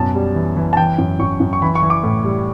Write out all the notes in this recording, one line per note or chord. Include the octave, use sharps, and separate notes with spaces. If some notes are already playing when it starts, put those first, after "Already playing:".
Already playing: F#2 B2 A5
G3
E3
E3
A5
E3 G5
F#2
F#2 C#6
F#2
C#6
E3 B5
C#6
E3
D6
A2
G3